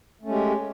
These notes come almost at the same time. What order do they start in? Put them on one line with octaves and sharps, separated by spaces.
A3 C#4 G#3 G4